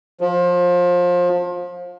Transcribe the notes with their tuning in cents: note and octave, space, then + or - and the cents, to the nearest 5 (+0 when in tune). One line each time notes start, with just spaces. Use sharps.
F3 +25